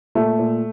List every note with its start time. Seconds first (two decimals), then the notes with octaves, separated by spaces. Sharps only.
0.15 A#2 A3
0.39 A#2